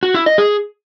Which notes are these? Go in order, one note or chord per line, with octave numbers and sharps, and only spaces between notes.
F#4
E4
D#5
G#4